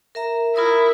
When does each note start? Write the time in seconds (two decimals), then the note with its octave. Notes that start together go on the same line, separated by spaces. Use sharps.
0.15 A#4 E5 A#5
0.56 E4 F4 A#4 D#6